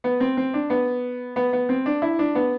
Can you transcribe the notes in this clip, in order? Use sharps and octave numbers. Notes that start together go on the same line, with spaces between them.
B3
C4
C4
D4
B3
B3
B3
C4
D4
E4
D4
B3